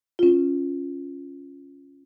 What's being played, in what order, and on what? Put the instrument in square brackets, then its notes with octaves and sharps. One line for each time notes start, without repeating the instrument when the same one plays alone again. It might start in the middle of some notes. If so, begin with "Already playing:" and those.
[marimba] C#4 F4